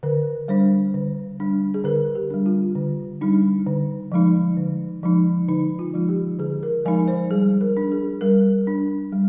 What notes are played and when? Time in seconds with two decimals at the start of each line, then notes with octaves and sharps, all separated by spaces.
0.03 D3 A#4
0.48 G3 D4 C5
0.94 D3
1.40 G3 D4
1.74 G#4
1.84 D3 A#4
2.15 G4
2.30 G3 D4
2.46 F4
2.75 D3
3.21 G3 D4 D#4
3.67 D3
4.12 F3 G#3 D#4
4.57 D3
5.03 F3 G#3 D#4
5.48 D3 D#4
5.79 F4
5.94 F3 G#3 D#4
6.09 G4
6.39 D3 G#4
6.63 A#4
6.85 F3 G#3 D#4 G#5
7.08 C5
7.30 G3 G#4
7.61 A#4
7.77 D4
7.92 G#4
8.21 G3 A#4
8.67 D4
9.13 G3